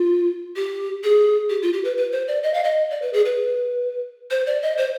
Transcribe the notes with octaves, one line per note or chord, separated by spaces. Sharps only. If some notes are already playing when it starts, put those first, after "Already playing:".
Already playing: F4
G4
G#4
G4
F4
G4
B4
B4
C5
D5
D#5
F5
D#5
D5
B4
G#4
B4
C5
D5
D#5
C5